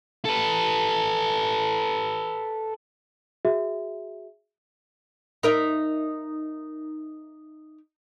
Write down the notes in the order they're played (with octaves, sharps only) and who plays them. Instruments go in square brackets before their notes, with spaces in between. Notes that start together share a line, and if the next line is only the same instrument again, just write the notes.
[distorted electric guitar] A4 B4
[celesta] F#4 G#4 E5
[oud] D#4 A#4 E5